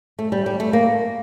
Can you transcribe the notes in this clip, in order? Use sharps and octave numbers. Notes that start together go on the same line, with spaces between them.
A3
G3
G3
A3
A#3